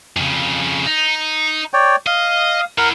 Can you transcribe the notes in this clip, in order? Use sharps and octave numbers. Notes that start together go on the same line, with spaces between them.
F2 C#3
D#4
C#5 D5 G5
D#5 F5
E4 A#4 F#5